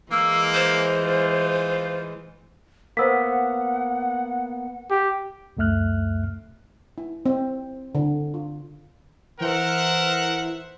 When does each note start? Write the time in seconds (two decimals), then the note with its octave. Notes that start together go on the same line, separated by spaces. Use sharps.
0.12 E3 G#3 A#3 E6
0.55 C5
1.03 F4
2.97 A#3 B3 C5 F#5 E6 B6
4.90 G4
5.57 C#2 F#2 A3 E5 F6 F#6
6.98 E4
7.26 C4
7.95 D3
8.34 F4
9.40 E3 A#4 C5 E5 F#5